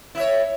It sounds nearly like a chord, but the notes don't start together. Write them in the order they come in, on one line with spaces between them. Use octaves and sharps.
E4 E5 C#5